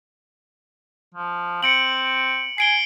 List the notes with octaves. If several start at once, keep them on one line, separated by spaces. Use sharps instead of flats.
F3
C4 C#7 D7 F#7
G#5 C7 D7 G7